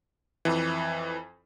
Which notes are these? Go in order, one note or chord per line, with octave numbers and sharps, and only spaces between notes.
F2 E3